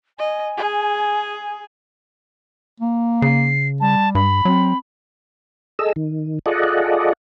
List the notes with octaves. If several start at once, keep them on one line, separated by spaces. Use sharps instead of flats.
D#5 G#5
G#4
A#3
C#3 C7
G3 A5
G2 B5
F#3 C4
G#4 A4 D#5 E6
D#3
F4 G#4 A4 D5 D#5 F#5